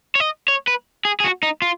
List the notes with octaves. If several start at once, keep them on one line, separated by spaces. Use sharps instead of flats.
C#5
D#5
C#5
B4
G#4
G#4
F#4
D#4
F4